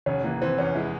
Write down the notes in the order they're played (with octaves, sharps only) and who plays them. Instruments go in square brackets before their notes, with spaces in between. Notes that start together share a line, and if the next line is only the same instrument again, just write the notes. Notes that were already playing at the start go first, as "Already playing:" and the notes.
[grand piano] F1 [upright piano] C#4
[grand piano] E3 [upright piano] A#3
[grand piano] E3 [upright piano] C4
[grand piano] E2 [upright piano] C#4
[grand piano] G#3 [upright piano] E4